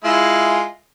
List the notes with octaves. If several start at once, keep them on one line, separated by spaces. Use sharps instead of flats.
G#3 E4 F4